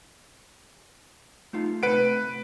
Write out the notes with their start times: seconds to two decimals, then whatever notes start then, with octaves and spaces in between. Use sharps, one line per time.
1.53 A3 D#4 F4
1.83 C3 A3 B4 F#5 D7